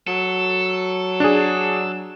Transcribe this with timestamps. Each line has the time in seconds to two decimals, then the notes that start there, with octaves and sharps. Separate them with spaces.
0.07 F#3 A4
1.20 D4 G#4